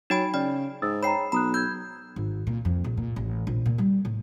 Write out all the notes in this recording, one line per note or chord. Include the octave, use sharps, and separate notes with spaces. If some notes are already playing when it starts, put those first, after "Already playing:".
F#3 D#4 G5 B5 A6 D7
C#3 D5 G5 F6
G#2 D#6 E6 A6
C#5 G5 A#5 B5 C7
B1 A#5 B5 D#6 F#6
E6 G6 G#6
G#1
A#2
F2
A#1
A#2
A1
A#1
A#2
G3
A2